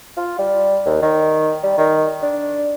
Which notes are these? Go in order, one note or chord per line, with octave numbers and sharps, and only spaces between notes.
F4
G3
D#2
D#3
G3
D#3
D4